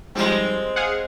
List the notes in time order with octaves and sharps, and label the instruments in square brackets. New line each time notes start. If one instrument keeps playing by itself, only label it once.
[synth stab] G#2 F3 G3 [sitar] G#3 C4
[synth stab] G#4 F5 F#5